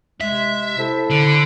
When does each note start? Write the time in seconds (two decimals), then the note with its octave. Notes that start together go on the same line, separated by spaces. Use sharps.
0.21 C3 G#3 E5
0.78 E4 A4 C5
1.10 D3